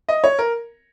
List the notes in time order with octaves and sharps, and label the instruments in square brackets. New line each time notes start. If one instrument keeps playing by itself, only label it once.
[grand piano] D#5
C#5
A#4